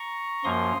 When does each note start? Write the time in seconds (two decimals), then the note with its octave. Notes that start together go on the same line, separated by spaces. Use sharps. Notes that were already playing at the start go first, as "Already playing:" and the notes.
Already playing: A#5 C#6
0.44 F#2 F3 A#3 C6 D#6